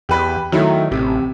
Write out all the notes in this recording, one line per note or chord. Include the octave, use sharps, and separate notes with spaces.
E2 G4 B4
D#3 F#3 A3 E4
A1 C3